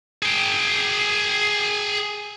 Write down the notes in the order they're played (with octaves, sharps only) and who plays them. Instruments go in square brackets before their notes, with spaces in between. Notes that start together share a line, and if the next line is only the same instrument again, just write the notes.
[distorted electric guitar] G#4 G5